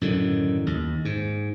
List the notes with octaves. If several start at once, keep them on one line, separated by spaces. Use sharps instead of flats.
F#2 A2 D3 D#3
D#2
G#2